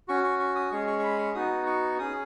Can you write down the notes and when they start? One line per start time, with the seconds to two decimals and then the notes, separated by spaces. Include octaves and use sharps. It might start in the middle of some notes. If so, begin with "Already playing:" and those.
0.08 C#4 F#4 C#6
0.24 C#6
0.39 C#6
0.56 D#6
0.71 G#3 C#4 G#4 C#6
0.87 C#6
0.99 C#6
1.04 B5
1.18 C#6
1.34 B3 D#4 F#4 D#6
1.66 C#6
1.99 C#4 G#4 D#6